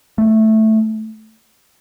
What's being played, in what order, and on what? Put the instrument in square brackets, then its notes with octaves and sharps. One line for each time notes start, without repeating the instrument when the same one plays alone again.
[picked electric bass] A3